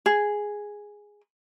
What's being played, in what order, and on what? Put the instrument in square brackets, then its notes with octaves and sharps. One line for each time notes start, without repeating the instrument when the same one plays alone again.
[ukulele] G#4